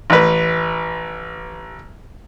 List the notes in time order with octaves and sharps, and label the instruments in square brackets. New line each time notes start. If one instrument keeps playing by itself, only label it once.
[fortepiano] A1 B4